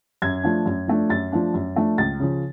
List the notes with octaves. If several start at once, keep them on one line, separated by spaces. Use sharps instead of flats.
F#2 G#6
F3 A3 D4
F#2
F3 A3 D4
F#2 A6
F3 A3 D4
F#2
F3 A3 D4
C#2 A6
C#3 F3